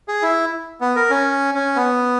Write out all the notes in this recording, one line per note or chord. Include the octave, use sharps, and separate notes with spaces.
G#4
E4
B3
A#4
C#4
C#4
B3